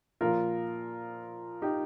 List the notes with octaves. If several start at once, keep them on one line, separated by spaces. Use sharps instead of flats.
A#2 F3 F4 A#4
D#4 G4